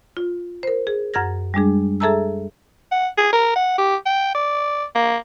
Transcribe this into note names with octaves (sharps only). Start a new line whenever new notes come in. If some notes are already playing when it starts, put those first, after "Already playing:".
F4
A#4 C5
G#4
F#2 F#5 F6 G#6 A#6
G3 G#3 D4 G#4
G#4 A4 E5 A5 A#5 E6
F#5
G#4
A#4
F#5
G4
G5
D5
A#3